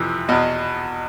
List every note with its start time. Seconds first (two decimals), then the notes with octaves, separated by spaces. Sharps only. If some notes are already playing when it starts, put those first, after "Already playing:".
Already playing: F2 C3 E3
0.29 E2 B2 D#5